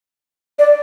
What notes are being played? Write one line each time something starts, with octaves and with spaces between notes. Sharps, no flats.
D5